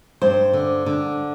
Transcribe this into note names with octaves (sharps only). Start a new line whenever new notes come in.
G2 C5
D3
D3